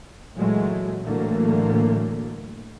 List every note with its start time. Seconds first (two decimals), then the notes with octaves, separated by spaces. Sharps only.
0.36 A#2 E3 F#3 G#3 A3
1.01 A2 D3 E3 F#3 A3 A#3